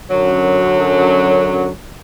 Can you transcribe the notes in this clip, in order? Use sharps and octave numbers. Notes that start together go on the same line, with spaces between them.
F#2 D3 F#3